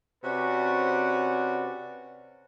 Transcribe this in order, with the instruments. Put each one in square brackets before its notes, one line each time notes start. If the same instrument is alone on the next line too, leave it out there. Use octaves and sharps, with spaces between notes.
[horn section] C3 C#4 F#4 B4 D5